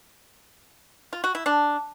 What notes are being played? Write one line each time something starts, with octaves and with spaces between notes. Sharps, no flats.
F4
F#4
E4
D4